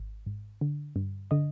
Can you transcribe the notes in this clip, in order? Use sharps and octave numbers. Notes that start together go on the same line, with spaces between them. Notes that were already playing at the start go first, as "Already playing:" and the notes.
Already playing: G#1
G#2
D3
G2
D3 D#5